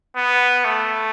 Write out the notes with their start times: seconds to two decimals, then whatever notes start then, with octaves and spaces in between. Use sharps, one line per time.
0.16 B3
0.65 A3